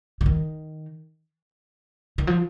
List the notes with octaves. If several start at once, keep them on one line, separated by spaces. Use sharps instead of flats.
D3
D#3
D#3
F3